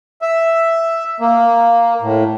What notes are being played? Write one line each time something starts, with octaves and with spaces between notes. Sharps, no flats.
E5
A#3
A2